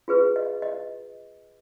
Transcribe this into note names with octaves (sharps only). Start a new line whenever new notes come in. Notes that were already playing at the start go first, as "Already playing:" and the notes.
F4 G#4 B4
D#5
D#5